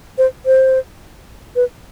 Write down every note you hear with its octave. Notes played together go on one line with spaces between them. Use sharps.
C5
C5
B4